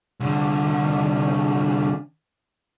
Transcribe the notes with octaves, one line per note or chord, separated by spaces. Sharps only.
C2 D3